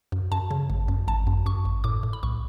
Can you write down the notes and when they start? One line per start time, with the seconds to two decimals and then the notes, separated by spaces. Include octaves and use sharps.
0.12 F#2
0.32 F#2 A5
0.51 C#3
0.70 G#1
0.88 F#2
1.08 G#1 A5
1.27 F#2
1.46 F#2 C#6
1.65 G#1
1.84 A2 D6
2.03 A2
2.13 B5
2.23 B1 C#6